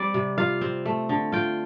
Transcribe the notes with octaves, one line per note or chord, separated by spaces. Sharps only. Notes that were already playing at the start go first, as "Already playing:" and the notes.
Already playing: G3 C4 D5
C3
F4 F5
C4
A3
D3
F4 G5